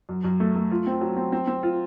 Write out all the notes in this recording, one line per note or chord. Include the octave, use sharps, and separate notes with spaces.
F#2
F#2
A3
A3
F4
C4
F#3
C4
C4
C4
F4